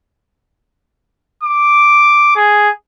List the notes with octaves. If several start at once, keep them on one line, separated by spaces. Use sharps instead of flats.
D6
G#4